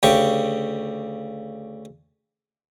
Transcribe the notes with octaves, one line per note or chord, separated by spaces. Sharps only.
D2 C#3 G4 C#6